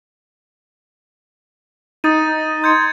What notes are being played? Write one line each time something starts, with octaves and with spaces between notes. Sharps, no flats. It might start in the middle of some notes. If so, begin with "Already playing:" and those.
D#4 D#6 A6 D#7
C6 G6 G#6 C#7